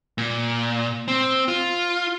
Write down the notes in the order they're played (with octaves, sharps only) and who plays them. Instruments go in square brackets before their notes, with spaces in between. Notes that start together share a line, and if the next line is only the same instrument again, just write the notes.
[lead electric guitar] A#2
C4
F4